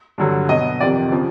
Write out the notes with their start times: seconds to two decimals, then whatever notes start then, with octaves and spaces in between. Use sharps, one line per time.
0.18 G2 D3 F#3
0.49 B2 F#3 D#5
0.80 F2 C3 D#3 D5
1.12 C#3 F3